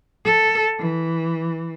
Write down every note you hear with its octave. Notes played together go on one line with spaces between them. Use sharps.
A4
E3